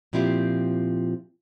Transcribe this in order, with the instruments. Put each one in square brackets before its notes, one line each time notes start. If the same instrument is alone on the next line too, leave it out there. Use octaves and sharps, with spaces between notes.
[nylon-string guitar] A#2 F3 C4 E4 F4 G4